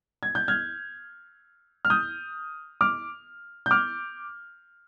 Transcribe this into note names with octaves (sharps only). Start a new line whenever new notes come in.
G#6
G6
F6 G#6
F6
D#6 G6
D6 F6
G6
D6 F6